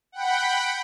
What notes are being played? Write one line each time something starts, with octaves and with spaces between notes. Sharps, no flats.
F#5 G5 B5